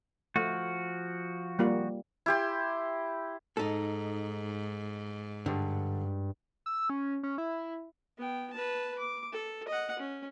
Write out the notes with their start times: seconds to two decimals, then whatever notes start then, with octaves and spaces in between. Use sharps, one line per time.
0.36 F3 A3 F#4
1.59 G3 A#3 F4
2.26 E4 G4 C6
3.57 G#2 D#4 A4
5.46 G2 D3
6.66 E6
6.90 C#4
7.23 C#4
7.38 E4
8.18 B3 G5
8.53 B4 A5
8.99 D6
9.32 A4
9.68 D#5 F#5
9.99 C#4